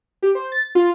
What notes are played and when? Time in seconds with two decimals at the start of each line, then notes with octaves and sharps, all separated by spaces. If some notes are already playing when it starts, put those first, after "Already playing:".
0.23 G4
0.35 C5
0.52 A6
0.75 F4